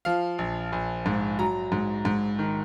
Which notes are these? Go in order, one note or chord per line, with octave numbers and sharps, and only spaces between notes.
F3 F5
A#1
A#1
G#2
F#3 A#5
G#2
G#2
D#3